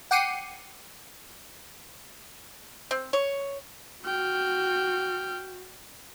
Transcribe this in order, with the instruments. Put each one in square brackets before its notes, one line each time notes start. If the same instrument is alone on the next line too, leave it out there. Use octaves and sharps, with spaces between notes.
[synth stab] F#5 G5 D6 C7 C#7 D#7
[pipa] C4
C#5
[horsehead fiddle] F#4 [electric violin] G5 F6